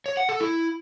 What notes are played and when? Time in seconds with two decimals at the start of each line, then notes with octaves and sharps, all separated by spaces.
0.06 C#5
0.17 F#5
0.29 A4
0.40 E4